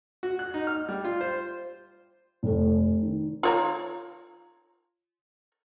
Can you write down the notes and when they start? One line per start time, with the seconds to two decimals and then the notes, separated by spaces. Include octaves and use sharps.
0.23 F#4
0.39 F#6
0.54 D#4
0.67 F6
0.89 G3
1.05 F4
1.21 C5
2.43 F1 A4
3.03 D#3
3.43 F4 C#5 A#5